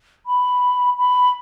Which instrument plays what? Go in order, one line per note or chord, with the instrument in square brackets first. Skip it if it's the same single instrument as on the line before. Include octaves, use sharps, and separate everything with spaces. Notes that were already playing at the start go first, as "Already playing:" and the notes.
[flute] B5
B5